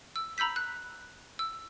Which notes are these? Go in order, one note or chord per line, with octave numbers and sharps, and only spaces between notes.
E6
A#5 B5 E6 G6 B6
F#6
E6